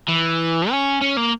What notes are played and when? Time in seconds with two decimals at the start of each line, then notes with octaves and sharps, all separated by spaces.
0.09 E3
0.71 C#4
1.02 C#4
1.17 A#3